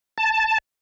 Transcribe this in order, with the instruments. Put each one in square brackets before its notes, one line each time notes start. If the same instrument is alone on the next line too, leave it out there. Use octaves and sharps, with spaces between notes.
[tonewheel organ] A5